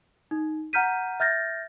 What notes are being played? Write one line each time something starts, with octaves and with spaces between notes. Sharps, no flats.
D#4
F#5 A#5 F6 G6 B6 D#7
E5 F6 G6 A6 A#6